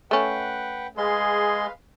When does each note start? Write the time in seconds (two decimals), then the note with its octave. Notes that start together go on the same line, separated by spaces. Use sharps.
0.11 A3 C#4 B4 F#5 G5
0.97 G#3 G#4 B4 F5 C6